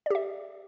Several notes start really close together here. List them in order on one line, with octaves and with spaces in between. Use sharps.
D5 G4 E5